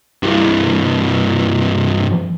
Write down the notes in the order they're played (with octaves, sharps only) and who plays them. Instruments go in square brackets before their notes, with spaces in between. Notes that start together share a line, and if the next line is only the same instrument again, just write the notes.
[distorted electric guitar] G2 E3